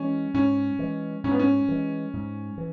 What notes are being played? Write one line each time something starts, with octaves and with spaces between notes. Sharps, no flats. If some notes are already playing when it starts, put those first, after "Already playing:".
Already playing: E3 G#3 C#4
G#2 C#4
E3 G#3
G#2 C#4
B3
C#4
E3 G#3
G#2
E3